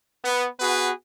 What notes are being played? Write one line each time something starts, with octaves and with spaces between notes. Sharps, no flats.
B3
B3 F#4 G#4 B4